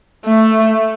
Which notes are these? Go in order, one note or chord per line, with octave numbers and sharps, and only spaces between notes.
A3